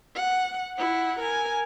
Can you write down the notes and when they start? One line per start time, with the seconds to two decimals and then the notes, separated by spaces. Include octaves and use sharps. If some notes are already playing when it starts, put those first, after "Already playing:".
0.15 F#5
0.78 E4 F#5
1.19 A#4 G#5